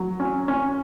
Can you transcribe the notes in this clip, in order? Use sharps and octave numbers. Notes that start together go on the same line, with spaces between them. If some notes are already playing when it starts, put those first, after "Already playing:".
Already playing: F#3
C#4
C#4